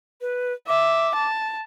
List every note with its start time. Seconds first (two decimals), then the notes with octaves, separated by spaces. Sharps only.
0.21 B4
0.68 E5 D6
1.15 A5